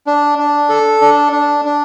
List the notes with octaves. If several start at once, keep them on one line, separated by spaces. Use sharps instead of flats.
D4
D4
A4
D4
D4
D4